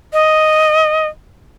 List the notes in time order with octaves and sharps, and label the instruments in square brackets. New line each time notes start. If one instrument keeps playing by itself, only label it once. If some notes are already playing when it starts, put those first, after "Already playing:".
[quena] D#5